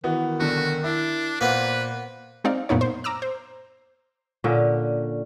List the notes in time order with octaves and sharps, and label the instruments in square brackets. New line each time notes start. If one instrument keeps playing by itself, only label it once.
[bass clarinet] D#3 [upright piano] E3 B3 F#4
[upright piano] B1 D3 [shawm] F#4
[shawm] D4 [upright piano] E4
[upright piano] A#2 [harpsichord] A#3 B3 [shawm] B4 [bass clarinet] C5
[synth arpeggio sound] G#3 C4 D#4 C5 D5 F5
F#2 A#2 B3 D#4 C#5
C5
A#5 D6 E6 F6
C5
[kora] A#2 D3 C#4